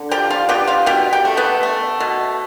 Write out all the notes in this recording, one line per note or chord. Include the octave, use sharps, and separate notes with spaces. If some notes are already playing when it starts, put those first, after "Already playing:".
Already playing: D3
F3 G4 G5
F4 F5
B3 G4 G5
F4 F5
B2 G4 G5
G4 G5
A3
B3 B4
A3
B2